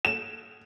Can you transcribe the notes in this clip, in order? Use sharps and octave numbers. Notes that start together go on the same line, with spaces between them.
E7